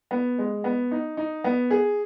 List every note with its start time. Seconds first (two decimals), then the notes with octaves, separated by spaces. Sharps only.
0.11 B3
0.38 G#3
0.64 B3
0.91 D#4
1.17 D#4
1.44 B3
1.70 G#4